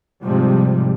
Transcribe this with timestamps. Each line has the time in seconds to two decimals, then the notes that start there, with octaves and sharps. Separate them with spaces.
0.23 G#2 C3 F3 G3